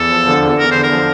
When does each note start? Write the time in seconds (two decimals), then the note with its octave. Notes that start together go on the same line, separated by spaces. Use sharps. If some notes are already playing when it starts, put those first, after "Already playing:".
Already playing: E2 A4
0.09 F3
0.26 D3
0.42 E2
0.58 E2 A#4
0.71 D3 C5
0.84 A#4
0.91 F3